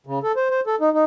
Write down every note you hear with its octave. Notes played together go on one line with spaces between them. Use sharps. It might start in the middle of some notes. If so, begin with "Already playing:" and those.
C#3
A4
C5
C5
A4
D#4
D#4